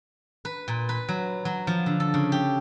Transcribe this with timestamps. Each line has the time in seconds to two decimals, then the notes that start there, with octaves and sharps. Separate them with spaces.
0.45 B4
0.68 A#2
0.89 B4
1.09 F#3
1.45 F#3
1.67 F3
1.86 D3
2.00 A4
2.14 C#3
2.32 G4